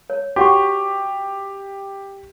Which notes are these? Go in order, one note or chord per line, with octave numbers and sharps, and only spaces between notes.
C#5
F#4 G4 F#5 C#6